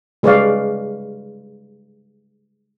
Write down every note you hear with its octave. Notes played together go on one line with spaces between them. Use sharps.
G3 G#3 B4 C#5 D5 F5